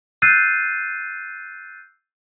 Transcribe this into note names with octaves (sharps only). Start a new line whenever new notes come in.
E6 F#6 G6 A6 C7 D#7